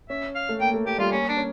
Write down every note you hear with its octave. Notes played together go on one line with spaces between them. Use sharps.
C#4 E5
F5
A3
A#3 G5
A3
A3 G4
G3 F4
A#3 C#4
D4
C#4